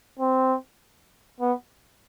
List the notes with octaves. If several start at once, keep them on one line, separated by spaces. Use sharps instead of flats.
C4
B3